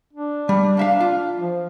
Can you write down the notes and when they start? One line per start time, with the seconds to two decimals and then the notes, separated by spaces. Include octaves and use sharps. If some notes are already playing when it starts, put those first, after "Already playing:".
0.13 D4
0.49 G3
0.77 A#3 E5 F5
1.01 F4
1.37 F3